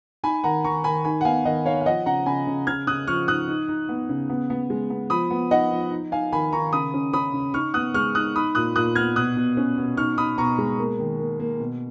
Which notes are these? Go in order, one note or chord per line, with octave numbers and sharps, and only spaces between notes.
D#4 G#5 B5
D#3 F#5 A#5
D#3 A#5 C#6
D#3 G#5 B5
D#4 G#5 B5
F#5
B3 F5 G#5
D#3 D#5 F#5
D#4 C#5 F5
F5
F3 D#5 F#5
C#3 F#5 A#5
C#3 G#5 B5
C#3
C#3 F6 G#6
C#3 D#6 F#6
F3 C#6 F6
D#4 D#6 F#6
D#4
D#4
B3
C#3
B3
B3
G#3
B3
F3 B5 D#6
B3
D#4 D#5 F#5
F3
D#4
D#4 F5 G#5
D#3 G#5 B5
D#3 A#5 C#6
C#3 B5 D#6
C#4
C#4 B5 D#6
C#3
D#4 C#6 F6
B3 D#6 F#6
G#3 C#6 F6
D#4 D#6 F#6
D#4 B5 D#6
A#2 D#6 F#6
A#2 D#6 F#6
B3 F6 G#6
B2 D#6 F#6
B2
C#4
B2
D#4 C#6 F6
D#4 B5 D#6
B2 A#5 C#6
G#3
A#3
D#3
A#3
A#3
B2